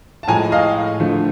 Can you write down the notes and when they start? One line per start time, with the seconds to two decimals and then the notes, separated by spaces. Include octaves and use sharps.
0.23 A5
0.28 A2 F3 G#3 G#5 A#5
0.52 D#5 F5
1.00 D3 F3 A3